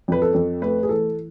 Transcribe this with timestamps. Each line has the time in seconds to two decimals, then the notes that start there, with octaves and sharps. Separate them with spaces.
0.08 F2 B4
0.22 A4
0.34 F2
0.62 A3 B4
0.83 G#4
0.89 E3 A4